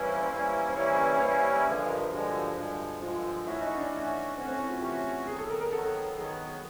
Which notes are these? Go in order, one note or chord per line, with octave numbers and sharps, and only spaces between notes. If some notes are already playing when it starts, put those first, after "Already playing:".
Already playing: E3 G3 A#3 C#4 E4 B4
C5
C5
E3 G3 A#3 C#4 E4 B4
C5
E3 G3 A#3 C#4 E4 C#5
C5
B4
C#5
E3 G3 A#3 C#4 E4 C5
G2 D3 F3 G#3 B4
B4
A#4
G2 D3 F3 G#3 F#4
G2 D3 F3 G#3
G2 D3 F3 G#3 F4
E3 A3 C#4 E4 F#4
D#4
D4
E3 A3 C#4 F#4
E3 A3 C4 C#4 F#4
C4
E4
F4
E3 A3 C#4 F#4 G4
D#3 F#3 B3 G#4
A4
A#4
A#4
D#3 F#3 B3 A4
D#3 F#3 B3 G#4